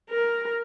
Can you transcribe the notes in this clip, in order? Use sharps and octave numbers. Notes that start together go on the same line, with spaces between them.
A#4